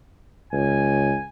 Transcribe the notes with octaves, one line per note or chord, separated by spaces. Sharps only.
C#2 G#5